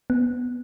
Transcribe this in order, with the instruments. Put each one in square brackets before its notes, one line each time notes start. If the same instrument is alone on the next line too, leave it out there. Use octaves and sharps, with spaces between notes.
[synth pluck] B3